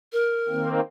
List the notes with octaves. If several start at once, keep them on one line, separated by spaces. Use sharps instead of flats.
A#4
D#3 A#3 C4